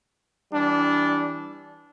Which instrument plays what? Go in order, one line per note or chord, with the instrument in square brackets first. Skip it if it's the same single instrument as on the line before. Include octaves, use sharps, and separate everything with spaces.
[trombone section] E3 G3 D4